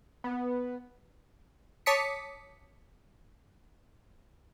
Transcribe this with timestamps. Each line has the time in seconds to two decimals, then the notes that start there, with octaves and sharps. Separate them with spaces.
0.24 B3
1.86 C#5 A5 D6 D#6 B6 C#7